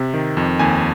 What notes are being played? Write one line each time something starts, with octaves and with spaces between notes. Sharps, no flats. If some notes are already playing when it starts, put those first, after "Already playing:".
Already playing: C3
D#3
F2
D#2 G#5